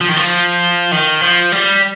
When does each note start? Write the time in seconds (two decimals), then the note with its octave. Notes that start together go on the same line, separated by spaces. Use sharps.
0.01 F3
0.09 D#3
0.16 F3
0.92 D#3
1.22 F3
1.52 G3